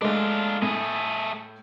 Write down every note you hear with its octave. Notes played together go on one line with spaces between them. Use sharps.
G#3 A3 D4 F4
A2 A3 G#4